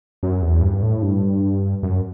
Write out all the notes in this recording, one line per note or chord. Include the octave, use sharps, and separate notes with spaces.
F#2
E2
G2
A2
G2
F#2